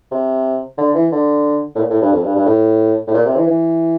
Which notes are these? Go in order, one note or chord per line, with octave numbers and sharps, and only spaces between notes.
C3
D3
E3
D3
A2
A#2
A2
G2
F2
G2
G2
A2
A2
A#2
C3
E3
E3